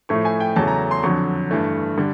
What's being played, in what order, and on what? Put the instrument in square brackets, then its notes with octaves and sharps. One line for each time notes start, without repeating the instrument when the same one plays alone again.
[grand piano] A2 F3 A3 C#6
G#5
G5
E2 C#3 F#3 A3 A5
A#5
C6
F2 D3 F#3 C#6
G2 E3 A3
D3 G3